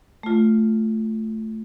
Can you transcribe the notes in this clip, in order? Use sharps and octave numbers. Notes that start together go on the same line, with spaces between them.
A3 F4